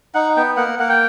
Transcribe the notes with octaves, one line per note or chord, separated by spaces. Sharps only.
D#4 F#5
B3 G5
A#3 F#5
A#3 F#5
G5